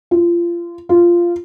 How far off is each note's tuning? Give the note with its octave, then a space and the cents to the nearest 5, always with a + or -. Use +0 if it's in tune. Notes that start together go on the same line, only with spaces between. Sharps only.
F4 -25
F4 -10